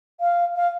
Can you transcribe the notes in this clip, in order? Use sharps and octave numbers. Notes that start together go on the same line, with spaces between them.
F5
F5